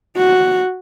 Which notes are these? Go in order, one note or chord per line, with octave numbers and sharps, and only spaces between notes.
F#4